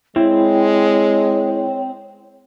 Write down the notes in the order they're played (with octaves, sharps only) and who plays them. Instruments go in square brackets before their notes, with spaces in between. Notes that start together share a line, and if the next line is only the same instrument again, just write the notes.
[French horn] G#3 [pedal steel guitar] C4 [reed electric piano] E4 [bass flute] C#5